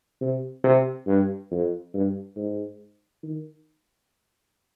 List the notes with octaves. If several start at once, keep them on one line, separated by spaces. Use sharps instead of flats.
C3
C3
G2
F2
G2
G#2
D#3